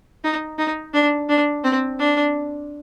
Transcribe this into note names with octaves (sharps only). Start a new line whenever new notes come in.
D#4
D#4
D4
D4
C4
D4